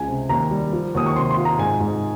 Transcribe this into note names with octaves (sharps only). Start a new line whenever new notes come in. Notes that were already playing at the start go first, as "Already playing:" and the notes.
Already playing: C#2 G#3 G#5
C3
D#2 A#5
G3
F3
D#2 D#6
C#6
C3 C6
C6
F4
A#5
G#2 G#5
G#2